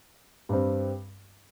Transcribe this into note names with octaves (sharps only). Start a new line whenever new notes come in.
G2 G3 C4